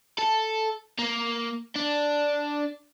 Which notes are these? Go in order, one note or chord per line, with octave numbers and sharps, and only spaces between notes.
A4
A#3
D4